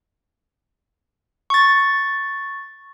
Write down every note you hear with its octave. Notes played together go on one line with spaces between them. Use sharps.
C#6 A6